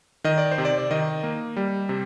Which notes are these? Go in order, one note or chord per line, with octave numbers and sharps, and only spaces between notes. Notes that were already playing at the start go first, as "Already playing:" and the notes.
D#3 D#5
D5
C5
C3
D5
D5
D#3 D#5
A#3
G3
C3